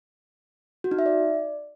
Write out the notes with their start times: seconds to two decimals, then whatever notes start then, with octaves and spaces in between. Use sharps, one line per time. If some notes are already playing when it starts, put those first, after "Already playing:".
0.84 F#4
0.91 D#4
0.99 E5
1.06 D5